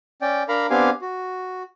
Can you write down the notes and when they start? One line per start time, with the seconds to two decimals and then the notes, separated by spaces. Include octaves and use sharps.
0.22 C#4 D5 G5
0.48 D4 A#4 F5 A#5 B5
0.70 B3 C4 D4 G4 F5 G#5
1.01 F#4